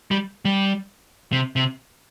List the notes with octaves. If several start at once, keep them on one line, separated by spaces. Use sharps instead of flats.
G3
G3
C3
C3